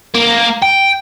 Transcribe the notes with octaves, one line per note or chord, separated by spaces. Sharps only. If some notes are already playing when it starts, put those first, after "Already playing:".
A#3
G5